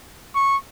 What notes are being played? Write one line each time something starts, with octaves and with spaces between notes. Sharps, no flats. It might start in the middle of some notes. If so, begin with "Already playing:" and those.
C#6